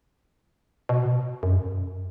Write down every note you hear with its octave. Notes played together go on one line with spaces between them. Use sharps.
B2
F#2